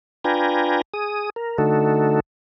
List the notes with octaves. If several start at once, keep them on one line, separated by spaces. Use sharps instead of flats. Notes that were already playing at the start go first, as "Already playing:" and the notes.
D4 F4 B4 G5 G#5 A#5
G#4 D#6
A#4
D3 A3 D#4 F#4 A4